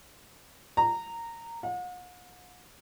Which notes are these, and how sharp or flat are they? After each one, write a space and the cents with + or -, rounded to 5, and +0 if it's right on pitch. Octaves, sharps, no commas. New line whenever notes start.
A#5 -15
F#5 -45